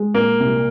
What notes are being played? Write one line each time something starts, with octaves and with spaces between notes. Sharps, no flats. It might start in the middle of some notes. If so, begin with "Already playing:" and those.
Already playing: G#3
A#2 A#3
C2